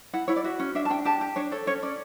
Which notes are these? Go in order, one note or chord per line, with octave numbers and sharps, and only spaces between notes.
E4 F#5
E4 C#5
D5
F#4 E5
C#4
D4 E5
A5
D4 G5
G4 A5
G4
D4 C#5
A4 C#5
C#4 C#5
C#4 D5